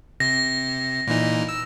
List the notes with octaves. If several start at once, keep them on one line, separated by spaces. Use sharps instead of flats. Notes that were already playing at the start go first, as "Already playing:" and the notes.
C3 A#6
A#2 E3 D#4
E6